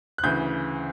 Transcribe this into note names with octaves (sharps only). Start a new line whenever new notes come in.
F#6
D2 C#3 E3 G6